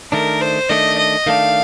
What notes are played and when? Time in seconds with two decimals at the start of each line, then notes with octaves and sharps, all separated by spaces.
0.12 D#3 A3 D4 A#4
0.41 C5
0.69 D#3 A3 D4 D#5
0.99 D#5
1.26 D#3 A3 D4 F5